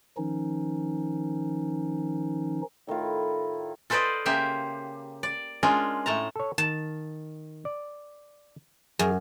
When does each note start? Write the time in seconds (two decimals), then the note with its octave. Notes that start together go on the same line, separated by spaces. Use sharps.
0.17 D#3 F3 C#4 D#4
2.87 A2 D#3 E4 F4
3.90 F4 A4 B4 C5 D5 D#5
4.25 C#3 A#3 G4 C5 E5
5.23 D5
5.63 G#3 C#4 D4 F4 A#4
6.06 A2 A3 A5 A#5
6.36 A4 C#5
6.58 D#3 A5
7.65 D5
8.99 F#2 G#4